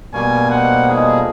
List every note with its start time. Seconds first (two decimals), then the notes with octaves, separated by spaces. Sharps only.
0.14 G2 B2 G3 A#3 G#5 C#6
0.50 D#4 C5 F#5
0.88 D#4 F4 G#4 A4